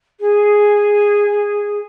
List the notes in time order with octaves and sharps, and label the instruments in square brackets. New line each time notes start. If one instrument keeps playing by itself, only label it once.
[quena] G#4